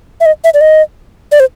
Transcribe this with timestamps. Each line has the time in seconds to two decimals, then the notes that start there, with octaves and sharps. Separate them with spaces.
0.20 E5
0.26 D#5
0.44 E5
0.54 D5
0.61 D#5
1.32 D5
1.40 C5